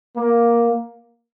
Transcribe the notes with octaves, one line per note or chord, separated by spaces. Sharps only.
A#3